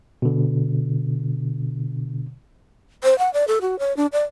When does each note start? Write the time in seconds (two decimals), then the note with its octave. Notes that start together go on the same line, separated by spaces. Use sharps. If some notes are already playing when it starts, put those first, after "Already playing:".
0.22 B2 D3
3.03 C5
3.19 F#5
3.33 D5
3.48 A4
3.61 F#4
3.79 C#5
3.97 D4
4.13 D5